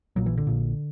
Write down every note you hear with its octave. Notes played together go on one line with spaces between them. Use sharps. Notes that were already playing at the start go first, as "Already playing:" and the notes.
A#1 A#2 F#3
E3
D3
A#1 A#2